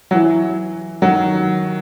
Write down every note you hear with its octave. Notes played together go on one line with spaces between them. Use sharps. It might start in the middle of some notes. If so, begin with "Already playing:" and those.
F#3
E3
D#3 F#3